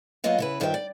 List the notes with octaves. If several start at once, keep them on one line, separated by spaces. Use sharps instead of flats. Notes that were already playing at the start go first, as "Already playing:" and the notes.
F#3 A#3 B3 F4 D#5 F5
C#3 E4 B4
G2 D#3 F4 C5 E5 G5
D5